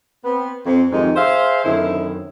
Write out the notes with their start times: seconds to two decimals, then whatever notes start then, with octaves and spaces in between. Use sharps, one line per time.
0.24 B3 C4
0.66 F2 C4
0.92 F2 G#2 C3 D#3 F3 D#4
1.16 G#4 C5 E5 F5
1.64 F#2 D3 D#3 C4 E4